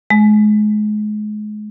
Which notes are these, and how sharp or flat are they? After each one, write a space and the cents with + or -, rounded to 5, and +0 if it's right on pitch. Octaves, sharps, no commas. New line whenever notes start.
G#3 +30